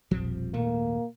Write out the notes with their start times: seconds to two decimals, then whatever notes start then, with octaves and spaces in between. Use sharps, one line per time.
0.11 E1 A#1 F3 G3 C4
0.54 G#1 D#2 A#2 A3 A#3